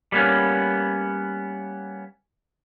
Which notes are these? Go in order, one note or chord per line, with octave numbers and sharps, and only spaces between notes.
G3 A#3 B3 C#4